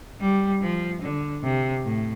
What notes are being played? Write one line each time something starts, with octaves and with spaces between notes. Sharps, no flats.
G3
F3
D3
C3
A2